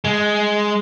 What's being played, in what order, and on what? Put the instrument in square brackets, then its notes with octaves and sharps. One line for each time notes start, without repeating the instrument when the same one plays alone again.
[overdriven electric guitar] G#3